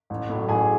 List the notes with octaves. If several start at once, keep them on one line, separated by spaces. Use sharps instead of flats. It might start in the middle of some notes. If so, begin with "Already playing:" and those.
A1
A2 F#3
A1 G#4 G#5